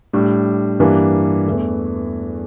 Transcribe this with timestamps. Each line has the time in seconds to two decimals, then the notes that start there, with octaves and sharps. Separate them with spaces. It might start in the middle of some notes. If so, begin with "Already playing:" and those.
0.13 A2 G3 D4
0.80 G2 E3 G3 A#3 D4
1.46 E2 E3 A3